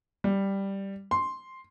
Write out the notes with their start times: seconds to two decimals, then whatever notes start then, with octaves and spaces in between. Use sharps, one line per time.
0.24 G3
1.11 C6